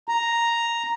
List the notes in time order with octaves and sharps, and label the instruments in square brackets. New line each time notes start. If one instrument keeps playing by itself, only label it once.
[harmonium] A#5